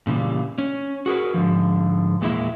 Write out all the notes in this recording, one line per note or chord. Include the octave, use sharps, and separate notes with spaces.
A#2 C#3 E3 G3
C#4
F#4 G#4 A#4 B4
G#2 B2 D3 F3
E2 A#2 G#3 A#3 E4 E5